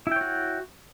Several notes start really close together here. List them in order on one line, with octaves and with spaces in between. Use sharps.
E4 G5 C#5 F#4